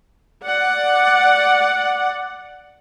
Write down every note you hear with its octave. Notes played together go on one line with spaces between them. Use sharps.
D5 F#5